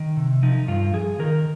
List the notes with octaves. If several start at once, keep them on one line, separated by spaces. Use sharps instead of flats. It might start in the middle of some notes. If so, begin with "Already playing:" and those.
Already playing: D#3
C3
F3 D#4
G2 F4
F3 G#4
D#3 A#4